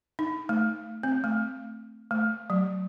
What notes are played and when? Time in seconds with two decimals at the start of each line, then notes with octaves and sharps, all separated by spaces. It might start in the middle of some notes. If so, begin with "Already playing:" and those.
0.19 D#4
0.49 A3
1.03 C4
1.24 A3
2.11 A3
2.50 F#3